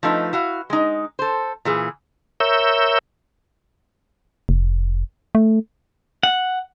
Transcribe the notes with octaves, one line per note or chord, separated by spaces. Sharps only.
F3 A3 D#4 B4
E4 F#4 F5
G#3 D#4
A4 C5
A#2 E3 G#4
A#4 C#5 E5 E6 G6
F1
A3
F#5